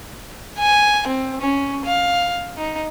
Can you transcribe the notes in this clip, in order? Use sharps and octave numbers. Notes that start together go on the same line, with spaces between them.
G#5
C4
C#4
F5
D#4